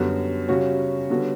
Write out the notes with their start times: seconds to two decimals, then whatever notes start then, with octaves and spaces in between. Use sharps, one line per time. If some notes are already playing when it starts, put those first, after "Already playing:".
Already playing: F#2 D3 G3 B3 F#4
0.48 C#3 G3 C#4 F#4 C#5
1.10 D3 G3 B3 F#4 C#5